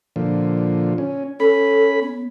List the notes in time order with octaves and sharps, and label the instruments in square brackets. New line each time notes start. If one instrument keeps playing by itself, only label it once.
[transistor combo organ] A#2 D3 F3
C#4
[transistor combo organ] C#4 B5 [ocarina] A4
[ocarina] B3